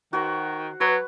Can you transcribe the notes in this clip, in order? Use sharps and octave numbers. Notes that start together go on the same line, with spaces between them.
D#3 F#4 C5
F#3 B4